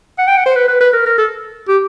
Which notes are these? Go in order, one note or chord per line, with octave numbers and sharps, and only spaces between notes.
F#5
G5
F#5
C5
B4
B4
B4
A#4
A#4
A4
G4